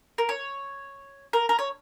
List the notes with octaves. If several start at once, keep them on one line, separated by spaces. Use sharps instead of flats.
A#4
C#5
A#4
A#4
C#5